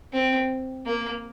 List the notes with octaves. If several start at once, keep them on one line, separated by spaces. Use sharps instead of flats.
C4
A#3